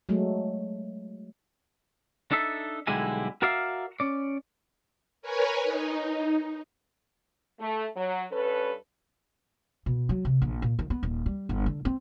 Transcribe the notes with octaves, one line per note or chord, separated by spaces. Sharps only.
F#3 G#3 A3
D4 D#4 A4 E5
B1 D3 G3 G#3 E4 G#5
F#4 A#4 D5 E5 F5
C#4 D5
A#4 B4 C#5 G#5
D#4
A3
F#3
G2 C#4 A4 B4
B2
F#3
C3
A#1
A#2
D#3
B3
D#1
G3
G1
D3
C4